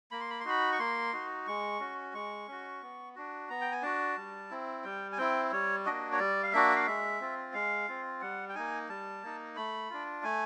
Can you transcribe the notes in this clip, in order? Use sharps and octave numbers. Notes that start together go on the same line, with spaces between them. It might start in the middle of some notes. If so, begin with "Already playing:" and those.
A#3 B5
C6
B5
C6
D#4 F#4 B5
C#6
A#3 C6
D#4 F#4
G#3 C#6
C#4 F#4
G#3 C#6
C#4 F#4
B3
D4 F#4
B3 A#5
G5
G#5
D4 F#4 A5
G3
C4 E4
G3 G5
G#5
C4 E4 G5
G3 C#5
A#3 D4 F#4 D#5
C#5
G3 D5
F5
A#3 D4 F#4 E5
F5
G#3 E5
C4 F4
G#3 F5
C4 F4
G3 F#5
G5
A#3 D#4 G#5
G3 A5
A#3 D#4
A3 B5
D4 F4
A3 G#5